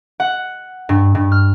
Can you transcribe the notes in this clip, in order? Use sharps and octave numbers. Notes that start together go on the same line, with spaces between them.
F#5
G2
G2
F6